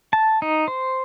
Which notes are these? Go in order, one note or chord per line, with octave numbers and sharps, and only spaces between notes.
A5
D#4
C5